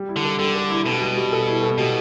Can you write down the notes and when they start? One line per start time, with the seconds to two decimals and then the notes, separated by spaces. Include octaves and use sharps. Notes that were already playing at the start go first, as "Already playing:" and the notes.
Already playing: G3
0.09 E4
0.16 D3
0.25 A4
0.39 D3 G3
0.55 A4
0.70 E4
0.86 B2 G3
1.01 G3
1.17 G3
1.32 A4
1.47 E4
1.63 A4
1.78 B2 G3